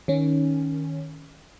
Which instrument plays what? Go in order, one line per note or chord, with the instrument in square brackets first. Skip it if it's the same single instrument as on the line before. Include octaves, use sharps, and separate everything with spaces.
[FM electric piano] D#3 C#4